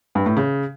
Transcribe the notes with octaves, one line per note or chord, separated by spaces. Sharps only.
G2
A2
C#3